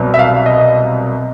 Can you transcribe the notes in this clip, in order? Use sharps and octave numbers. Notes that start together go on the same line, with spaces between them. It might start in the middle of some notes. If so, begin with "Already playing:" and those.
Already playing: C2 B2 F#3 B3
E5
F5
D#5